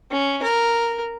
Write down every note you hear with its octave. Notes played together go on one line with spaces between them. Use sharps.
C#4
A#4